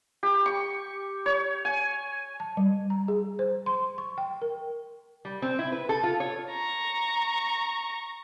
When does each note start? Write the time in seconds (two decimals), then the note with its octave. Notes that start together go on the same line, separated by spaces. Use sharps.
0.23 G4
0.46 C#6
1.26 C#5
1.65 G#5
2.40 A5
2.57 G3
2.90 A#5
3.08 G#4
3.39 C5
3.66 C6
3.98 C#6
4.18 G5
4.42 A#4
5.25 G3
5.42 C4
5.59 E4
5.72 B4
5.89 A4
6.03 F4
6.20 C#5
6.50 A#5 C#6